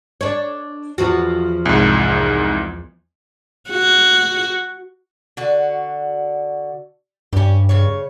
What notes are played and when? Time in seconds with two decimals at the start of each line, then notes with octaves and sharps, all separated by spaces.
0.21 D4 C#5
0.98 E2 F3 F#4
1.66 C2 G#2
3.70 F#4
5.37 D3 F#4
7.33 G2 C#4 G4
7.69 C#3 C#5